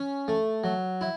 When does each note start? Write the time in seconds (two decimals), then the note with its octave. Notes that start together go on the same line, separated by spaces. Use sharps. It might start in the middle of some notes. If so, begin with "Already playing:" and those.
Already playing: C#4
0.28 A3
0.64 F#3
1.01 E4